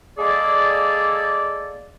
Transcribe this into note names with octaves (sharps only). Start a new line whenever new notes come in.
G#3 A#3 G#4 A4 D5